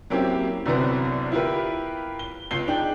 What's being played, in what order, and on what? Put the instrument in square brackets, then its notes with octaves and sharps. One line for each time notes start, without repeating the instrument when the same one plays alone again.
[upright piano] F#3 A#3 C4 C#4 E4 G4
C2 F#2 D3 E3 B3 C4
E4 F4 G4 A#4 B4
G7
C#2 C7 G7
D4 D#4 G#4 G5